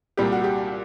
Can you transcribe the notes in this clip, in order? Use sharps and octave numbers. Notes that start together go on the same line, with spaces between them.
C2 A#2 G3 G4
F#4
G4